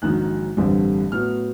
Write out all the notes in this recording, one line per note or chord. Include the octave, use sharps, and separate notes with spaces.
A#1 G#2 D#3 F#3 F#6
A1 G2 D3 G3 C4
A2 F#3 B3 F6